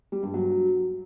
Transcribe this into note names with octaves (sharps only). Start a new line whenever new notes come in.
G3
G2
F#3